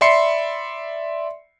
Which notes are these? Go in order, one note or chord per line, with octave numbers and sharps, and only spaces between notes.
D5 E5 B5 C6 C7 C#7